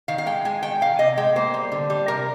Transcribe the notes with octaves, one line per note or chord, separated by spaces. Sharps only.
D#3 F5
F5
G#3 G5
G#3 G#5
D#3 G5
D#3 F5
C3 D#5
G#3 G5
A#3 C5
G3
D3
G3
C3 A#4